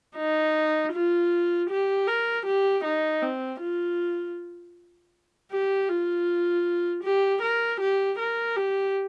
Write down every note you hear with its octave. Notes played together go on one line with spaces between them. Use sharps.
D#4
F4
G4
A#4
G4
D#4
C4
F4
G4
F4
G4
A#4
G4
A#4
G4